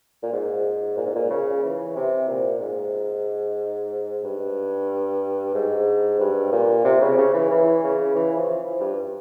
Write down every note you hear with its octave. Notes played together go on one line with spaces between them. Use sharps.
A#2
G#2
A#2
G#2
A#2
C#3
E3
C3
A#2
G#2
G2
G#2
G2
A#2
C3
C#3
C#3
E3
E3
C#3
E3
F3
G2